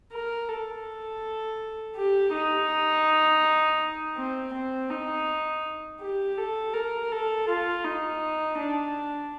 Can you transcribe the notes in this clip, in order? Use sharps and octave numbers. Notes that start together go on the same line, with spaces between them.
A#4
A4
G4
D#4
C4
C4
D#4
G4
A4
A#4
A4
F4
D#4
D4